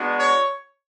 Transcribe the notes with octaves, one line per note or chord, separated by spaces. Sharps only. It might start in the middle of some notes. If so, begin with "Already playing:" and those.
Already playing: G#3 B3 D4 F#4
C#5